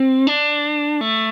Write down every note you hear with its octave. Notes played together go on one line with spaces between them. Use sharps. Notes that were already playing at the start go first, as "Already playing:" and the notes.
Already playing: C4
D4
A3